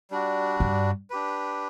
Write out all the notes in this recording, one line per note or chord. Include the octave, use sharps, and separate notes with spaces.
G3 D4 F#4
G2
D4 G4 B4